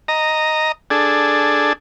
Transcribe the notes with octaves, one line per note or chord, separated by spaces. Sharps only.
D#5 A#5
D4 G#4 A4